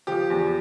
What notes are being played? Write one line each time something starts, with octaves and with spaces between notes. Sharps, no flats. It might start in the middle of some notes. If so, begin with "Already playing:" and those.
F3 G4
E2